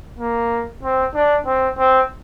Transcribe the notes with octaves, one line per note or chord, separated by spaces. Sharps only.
A#3
C4
D4
C4
C4